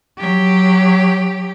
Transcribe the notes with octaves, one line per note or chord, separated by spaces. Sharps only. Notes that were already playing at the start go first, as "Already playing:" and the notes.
F#3 G4